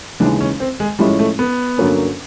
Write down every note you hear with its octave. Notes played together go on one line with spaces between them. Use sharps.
D#2 C#3 E3 G#3 D4
C#4
C4
G#3
A2 F3 G3 G#3 C#4 E4
A3
B3
G2 D3 F#3 A#3 C#4